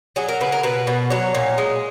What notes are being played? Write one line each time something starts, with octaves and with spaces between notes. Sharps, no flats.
F#3 G#4
A#4
C#3 B4
A#4
B2 B4
B2
F#3 C#5
A#2
G#3